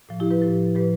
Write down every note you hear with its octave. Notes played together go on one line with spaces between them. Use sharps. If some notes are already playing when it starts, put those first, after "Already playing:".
A2 F3
E4 G4
G4 B4
A2 F3
A2 F3 G4 B4